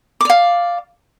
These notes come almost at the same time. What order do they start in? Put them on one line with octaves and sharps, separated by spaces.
D6 D5 F5